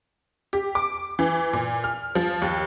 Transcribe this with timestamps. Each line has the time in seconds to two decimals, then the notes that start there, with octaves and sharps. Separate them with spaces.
0.53 G4
0.75 D6
1.19 E3
1.53 A#2
1.84 F6
2.15 F3
2.42 D#2